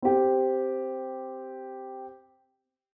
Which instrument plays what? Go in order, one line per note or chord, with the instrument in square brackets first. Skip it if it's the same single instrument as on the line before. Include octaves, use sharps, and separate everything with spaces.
[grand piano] C4 G4